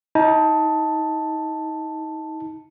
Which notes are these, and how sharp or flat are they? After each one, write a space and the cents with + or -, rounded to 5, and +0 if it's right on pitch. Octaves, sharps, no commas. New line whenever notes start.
D#4 +30 A5 +0